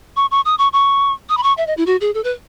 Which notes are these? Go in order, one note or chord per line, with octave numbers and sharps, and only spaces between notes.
C#6
C#6
D#6
C#6
C#6
D#6
B5
C#6
E5
D#5
E4
F#4
G#4
A4
B4